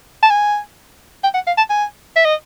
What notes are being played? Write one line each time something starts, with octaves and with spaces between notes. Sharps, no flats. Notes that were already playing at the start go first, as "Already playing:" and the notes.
A5
G#5
G5
F#5
F5
A5
G#5
E5
D#5